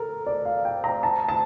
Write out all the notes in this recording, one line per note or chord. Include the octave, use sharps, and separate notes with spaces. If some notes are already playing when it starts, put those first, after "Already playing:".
Already playing: A4 A#4
D5
F5
G5
A#5
A5
A5